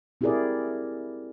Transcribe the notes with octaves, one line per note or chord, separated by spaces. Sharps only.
C4 E4 G4 G#4 A#4 D5